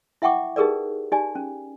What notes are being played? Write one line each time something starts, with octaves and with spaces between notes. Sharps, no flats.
E4 E5 F#5 G5 C#6 D6
D#4 G4 G#4 A#4 B4 D5
D#4 G4 D5 G#5
C#4